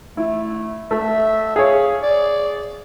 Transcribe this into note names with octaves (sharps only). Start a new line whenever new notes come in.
A3 E4
A3 E5
G#4 C#5 F5
D5